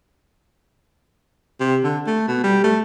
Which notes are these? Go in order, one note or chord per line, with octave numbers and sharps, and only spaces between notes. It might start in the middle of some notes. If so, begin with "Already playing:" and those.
C3
D3
A3
B2
G3
A3